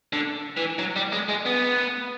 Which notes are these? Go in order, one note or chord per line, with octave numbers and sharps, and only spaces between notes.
D3
E3
F#3
G3
G#3
G#3
B3